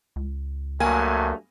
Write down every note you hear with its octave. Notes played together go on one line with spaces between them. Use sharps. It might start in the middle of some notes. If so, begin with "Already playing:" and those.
C#2
G2 F#3 A3 A#3 G#5